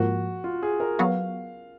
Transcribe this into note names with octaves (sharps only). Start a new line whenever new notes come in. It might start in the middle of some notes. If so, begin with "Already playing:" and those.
Already playing: G#2 F3 A#3 F#4
F4
G#4
A#4
F#3 B3 F#4 F5